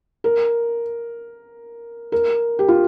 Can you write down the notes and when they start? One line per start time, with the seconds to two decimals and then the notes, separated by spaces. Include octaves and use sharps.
0.24 A#4
2.12 A#4
2.59 G4
2.68 F4